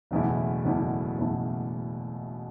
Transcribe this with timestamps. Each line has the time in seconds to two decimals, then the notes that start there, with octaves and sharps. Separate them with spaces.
0.11 F#1 E2 B2 A3 E4
0.64 F#1 E2 B2 A3 E4
1.17 F#1 E2 B2 A3 E4